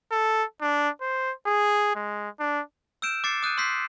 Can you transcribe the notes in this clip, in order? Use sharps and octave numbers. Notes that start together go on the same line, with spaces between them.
A4
D4
C5
G#4
G#3
D4
E6 F6 G6 D7 E7
D6 F#6 A6 C7 C#7
D#6 F#6 G6 D#7
C6 E6 G6 B6 C7